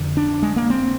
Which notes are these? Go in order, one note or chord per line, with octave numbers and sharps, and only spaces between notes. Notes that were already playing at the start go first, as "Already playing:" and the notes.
Already playing: F2 D3
D4
G#3
A#3
C4